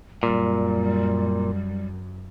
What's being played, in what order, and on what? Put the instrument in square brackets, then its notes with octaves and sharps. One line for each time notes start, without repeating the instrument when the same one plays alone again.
[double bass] F#2 [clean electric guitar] A#2 [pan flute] G3